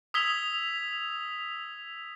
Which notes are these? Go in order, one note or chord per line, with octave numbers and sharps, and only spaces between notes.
D#6 E6 G#6 B6 F7 G7